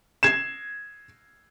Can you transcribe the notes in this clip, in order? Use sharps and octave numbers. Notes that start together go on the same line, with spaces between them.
G#6 C7 E7